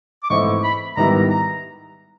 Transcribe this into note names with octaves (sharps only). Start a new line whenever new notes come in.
D6
G#2 E3 A3 C4 E4 C#6
B5
G#2 D#3 G3 B3 E4 A#5
A#5